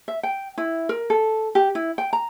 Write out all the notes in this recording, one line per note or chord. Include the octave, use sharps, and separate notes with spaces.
E5
G5
E4
A#4
A4
G4
E4
G5
A#5